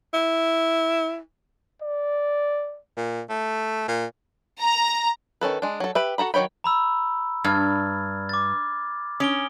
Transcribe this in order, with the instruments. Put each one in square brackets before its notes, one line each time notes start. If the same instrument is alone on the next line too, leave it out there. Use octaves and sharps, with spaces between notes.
[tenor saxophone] E4
[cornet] D5
[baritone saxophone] A#2
A3
A#2
[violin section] A#5
[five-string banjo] D#3 C#4 A4 B4
G#3 D4
F#3 A4
G4 B4 E5
F#4 A4 A#5 B5
D#3 F#3 C#5 G5 B5
[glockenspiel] A#5 B5 E6
[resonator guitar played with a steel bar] G2 [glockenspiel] F6 G#6 A6
[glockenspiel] D6 A6
[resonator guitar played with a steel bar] C#4 [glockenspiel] D#6 D7 G7